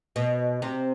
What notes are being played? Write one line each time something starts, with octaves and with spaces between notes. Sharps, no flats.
B2
C3